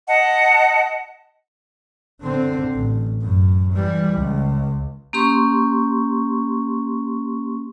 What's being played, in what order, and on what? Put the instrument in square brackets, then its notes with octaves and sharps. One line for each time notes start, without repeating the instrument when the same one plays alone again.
[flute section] D#5 F#5 A5
[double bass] D3 C4
A1
F#2
E3 G3
C#2
[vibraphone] A#3 C#4 G4 C6 C#6